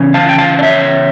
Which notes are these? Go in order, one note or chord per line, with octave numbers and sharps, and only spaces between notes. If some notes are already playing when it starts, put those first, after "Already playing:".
Already playing: C#3 E3 C#4
F5 A5
G5
F5 A5
D5
C#5 E5